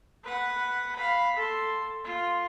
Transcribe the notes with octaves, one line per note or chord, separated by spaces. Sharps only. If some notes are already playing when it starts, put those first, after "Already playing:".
B4 F#5
F5 B5
A4 C6
F4